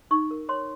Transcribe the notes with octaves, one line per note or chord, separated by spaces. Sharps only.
D#4 C#6
A#4
C#5 C6